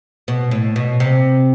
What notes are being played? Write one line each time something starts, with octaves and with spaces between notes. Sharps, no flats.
B2
A2
B2
C3